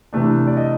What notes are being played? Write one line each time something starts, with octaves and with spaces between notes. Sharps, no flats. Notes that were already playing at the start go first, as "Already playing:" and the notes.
C3 E3 A3 D4
D5
D#5